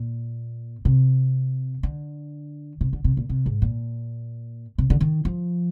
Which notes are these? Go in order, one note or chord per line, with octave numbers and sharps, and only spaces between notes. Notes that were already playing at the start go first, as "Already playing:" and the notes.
Already playing: A#2
C3
D3
C3
D3
C3
A#2
C3
G#2
A#2
C3
D3
D#3
F3